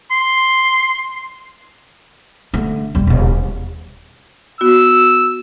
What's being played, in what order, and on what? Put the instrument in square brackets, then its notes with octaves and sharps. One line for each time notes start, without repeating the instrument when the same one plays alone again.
[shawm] C6
[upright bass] D3 A3
E1 G3
D#1 C#3
[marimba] B3 F#4 [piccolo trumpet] E6